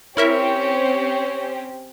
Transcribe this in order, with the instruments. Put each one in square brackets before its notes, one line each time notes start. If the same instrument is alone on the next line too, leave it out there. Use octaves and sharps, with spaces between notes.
[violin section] C4 C#4 G4 [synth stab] E4 A#4 E5 [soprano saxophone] C#5